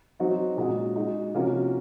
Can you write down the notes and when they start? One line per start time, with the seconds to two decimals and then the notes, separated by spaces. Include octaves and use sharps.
0.20 F#3 C4 D#4 F#4
0.57 A#2 G#3 C#4 F#4
0.96 G#3 D#4 F#4
1.34 C3 F3 A#3 C#4 F#4